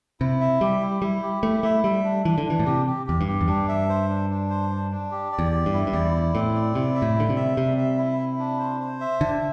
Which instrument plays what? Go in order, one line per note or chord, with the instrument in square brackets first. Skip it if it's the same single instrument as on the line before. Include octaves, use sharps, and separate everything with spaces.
[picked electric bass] C3 [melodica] E4
[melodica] E5
[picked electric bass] G3 [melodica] G4
[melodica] E4
[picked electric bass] G3 [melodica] E4
[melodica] G4
[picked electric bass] A3 [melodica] E4
[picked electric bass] A3 [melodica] E5
[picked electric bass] G3 [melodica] E5
[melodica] D4
[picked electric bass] E3 [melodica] D4
[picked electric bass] D3
[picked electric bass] E3 [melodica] D4
[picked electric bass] A2
[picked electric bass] C3 [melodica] G4
[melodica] G4
[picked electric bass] E2 [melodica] G4
[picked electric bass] G2
[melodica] G4
[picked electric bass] E2
[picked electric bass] G2 [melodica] D4
[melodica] E5
C5
D4
D4
C5
D4
D4
G4
D5
[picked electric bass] E2
[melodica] G4
[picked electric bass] G2
[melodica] E4
[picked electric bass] G2
[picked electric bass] E2 [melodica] D5
[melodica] E4
[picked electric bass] A2 [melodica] C4
[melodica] D5
[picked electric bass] C3 [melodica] E4
[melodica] E5
[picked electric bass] A2
[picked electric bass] D3 [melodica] G3
[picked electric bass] C3
[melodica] E5
[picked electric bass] C3 [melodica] G3
[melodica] E5
E4
E4
D4
C5
C5
E5
[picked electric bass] D3 [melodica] D4